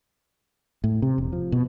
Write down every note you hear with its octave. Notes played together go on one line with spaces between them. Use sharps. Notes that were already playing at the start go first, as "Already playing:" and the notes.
A2
C3
E1
F3
B2